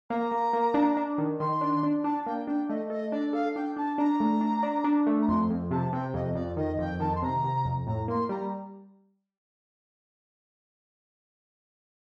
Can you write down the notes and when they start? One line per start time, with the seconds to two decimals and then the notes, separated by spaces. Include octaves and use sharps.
0.10 A#3 A#5
0.32 A#3
0.53 A#3
0.74 D4
0.97 D4
1.18 D#3
1.39 D#3 C6
1.61 D4
1.83 D4
2.04 D4 A5
2.26 A#3 G5
2.47 D4 G5
2.68 A3 D#5
2.90 A4 D#5
3.12 D4 D5
3.33 A4 F5
3.56 D4 G5
3.77 D4 A5
3.98 D4 A#5
4.20 A3
4.41 D4
4.63 D4
4.84 D4
5.07 A3
5.21 A#5
5.28 F2 C6
5.50 F2
5.71 C3 A5
5.93 C3 G5
6.14 F2 D#5
6.35 F2 D5
6.57 D#3 D#5
6.78 F2 G5
7.00 D#3 A5
7.15 C6
7.22 C3 A#5
7.44 C3
7.65 F2
7.87 A2 A#5
8.08 A#3 C6
8.29 G3 A#5